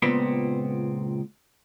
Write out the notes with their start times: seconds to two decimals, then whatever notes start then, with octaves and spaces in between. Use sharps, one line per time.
0.02 C#2 A#2 B3 C4